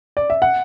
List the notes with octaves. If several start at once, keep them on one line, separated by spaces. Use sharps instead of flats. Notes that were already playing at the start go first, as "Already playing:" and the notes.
D5
E5
F#5